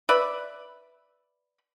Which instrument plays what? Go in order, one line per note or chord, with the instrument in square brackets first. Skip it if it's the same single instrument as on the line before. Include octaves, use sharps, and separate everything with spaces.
[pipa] B4 D5 E5 B5